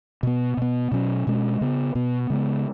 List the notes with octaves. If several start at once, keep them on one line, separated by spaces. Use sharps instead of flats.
B2 B3
B2 B3
B2 F#3 C#4
B2 G#3 C#4
C#3 B3
B2 B3
C#3 G#3 B3